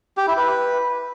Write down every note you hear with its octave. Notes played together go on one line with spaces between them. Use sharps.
G4
E4
B4